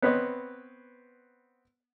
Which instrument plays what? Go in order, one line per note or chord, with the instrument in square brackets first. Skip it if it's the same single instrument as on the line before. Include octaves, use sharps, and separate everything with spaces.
[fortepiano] B3 C4 B4 C#5 D#5